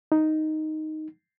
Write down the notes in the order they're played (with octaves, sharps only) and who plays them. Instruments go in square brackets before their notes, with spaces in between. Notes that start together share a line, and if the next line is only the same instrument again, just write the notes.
[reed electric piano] D#4